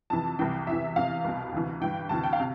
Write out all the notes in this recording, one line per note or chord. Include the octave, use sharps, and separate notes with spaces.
F2 C3 E3 A5
C2 C3 E3 G5
E2 C3 E3 E5
E2 C3 E3 F5
C2 B2
D2 C3 E3
G2 E3 G5
D2 C3 E3 A5
G5
F5
C3